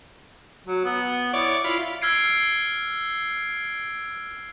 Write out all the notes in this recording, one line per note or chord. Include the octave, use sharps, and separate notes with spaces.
F#3
B3
E4 C#5 D5
E4 F4 B5
E6 F6 G#6 C7 D7